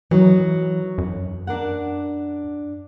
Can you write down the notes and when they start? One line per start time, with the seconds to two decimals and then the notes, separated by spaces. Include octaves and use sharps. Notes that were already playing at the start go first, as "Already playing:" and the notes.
0.11 E3 F#3 D#4
0.98 F#2
1.47 D4 A#4 F#5